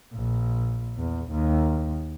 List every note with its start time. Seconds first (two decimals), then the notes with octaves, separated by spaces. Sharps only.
0.14 A#1
0.97 E2
1.31 D#2